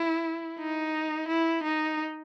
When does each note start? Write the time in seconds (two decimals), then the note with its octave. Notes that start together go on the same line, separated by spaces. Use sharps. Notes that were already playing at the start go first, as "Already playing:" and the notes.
Already playing: E4
0.59 D#4
1.28 E4
1.64 D#4